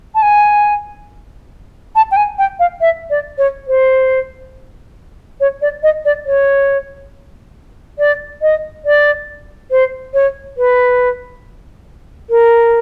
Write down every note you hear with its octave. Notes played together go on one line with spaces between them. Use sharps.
A5
G#5
A5
G5
G#5
G5
F5
E5
D5
C#5
C5
C#5
D5
D#5
D5
C#5
D5
D#5
D5
C5
C#5
B4
A#4